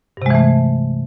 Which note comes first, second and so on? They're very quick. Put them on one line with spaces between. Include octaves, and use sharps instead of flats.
G2 C3 G#3 E3 A3